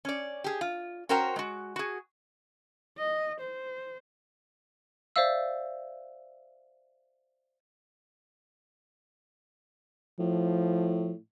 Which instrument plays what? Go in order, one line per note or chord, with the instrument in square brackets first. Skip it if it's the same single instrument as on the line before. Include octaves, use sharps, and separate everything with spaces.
[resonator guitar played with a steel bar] C#4 D5
G4 G#4
F4
C#4 F#4 A#4 C5 G5 A#5
G#3 F#4
F#4 G#4
[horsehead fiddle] D#5
C5
[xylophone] C5 D5 E5 F5 E6
[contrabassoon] A2 [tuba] F3